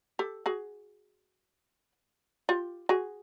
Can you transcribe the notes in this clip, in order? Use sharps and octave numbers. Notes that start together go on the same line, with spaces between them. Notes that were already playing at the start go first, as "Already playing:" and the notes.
G4 A4
F#4 G#4
F4 G4
F#4 G#4